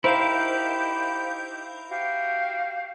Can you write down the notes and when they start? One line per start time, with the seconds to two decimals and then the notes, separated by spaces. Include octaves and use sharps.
0.04 D#4 E4 G4 A#4 C5 F5 G6
1.89 F#4 G4 F5